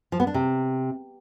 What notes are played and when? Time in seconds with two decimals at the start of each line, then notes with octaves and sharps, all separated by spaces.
0.12 F3
0.20 B3
0.27 D4
0.34 C3